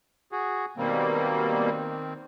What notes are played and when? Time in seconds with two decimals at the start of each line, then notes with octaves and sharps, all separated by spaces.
0.32 F#4 G#4
0.77 B2 D#3 G3 A#3 C4